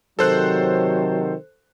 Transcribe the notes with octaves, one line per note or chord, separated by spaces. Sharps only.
C3 D#3 F#3 A4 C5 F#6